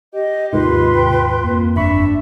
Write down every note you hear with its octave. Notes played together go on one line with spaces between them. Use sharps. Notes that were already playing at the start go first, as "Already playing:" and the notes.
G4 D#5
D#2 G#2 C3 D#3 F4 B4 C6
G5
F2 A#3
G1 D4 E5 B5 C#6